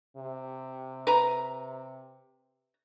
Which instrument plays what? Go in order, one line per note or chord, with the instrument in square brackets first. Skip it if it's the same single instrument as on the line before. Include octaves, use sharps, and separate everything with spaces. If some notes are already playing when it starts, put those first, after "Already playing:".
[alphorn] C3
[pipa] B4 A#5